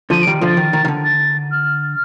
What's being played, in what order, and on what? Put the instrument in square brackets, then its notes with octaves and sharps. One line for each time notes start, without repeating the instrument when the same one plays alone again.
[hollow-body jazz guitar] D3 F3 [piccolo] D#7
[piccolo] D7
[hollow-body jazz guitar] D#3 G3
[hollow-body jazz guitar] D3 F3 [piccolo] A6
[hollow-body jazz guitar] D#3
D#3
D#3
D3
[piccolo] A6
F6